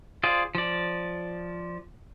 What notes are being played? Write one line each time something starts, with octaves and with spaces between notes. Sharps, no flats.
F4 G#4 C5 D5
F3 D5